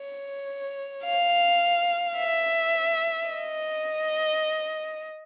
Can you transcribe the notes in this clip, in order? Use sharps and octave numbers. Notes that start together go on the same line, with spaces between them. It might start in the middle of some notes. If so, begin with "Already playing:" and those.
Already playing: C#5
F5
E5
D#5